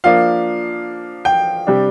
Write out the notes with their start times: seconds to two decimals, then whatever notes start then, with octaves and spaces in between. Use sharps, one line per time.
0.04 F3 A#3 D4 F5
1.25 G5
1.67 C3 G3 D4